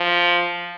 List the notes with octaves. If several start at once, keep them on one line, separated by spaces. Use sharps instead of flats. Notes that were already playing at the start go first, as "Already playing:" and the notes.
Already playing: F3